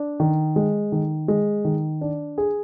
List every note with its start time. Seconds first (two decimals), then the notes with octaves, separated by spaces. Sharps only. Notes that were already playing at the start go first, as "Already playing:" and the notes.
Already playing: D4
0.20 D#3
0.56 G#3
0.92 D#3
1.28 G#3
1.65 D#3
2.01 D4
2.38 G#4